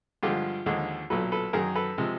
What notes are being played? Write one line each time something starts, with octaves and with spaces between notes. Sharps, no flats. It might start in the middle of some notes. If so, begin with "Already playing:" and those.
G2 D3 F3 G#3 F4 G4
D#2 D3 F3 G#3
B1 A#2 F#3 A4 B4
A4 B4
F#2 D#3 F#3 G#4 A#4
A4 B4
C3 F3 G#3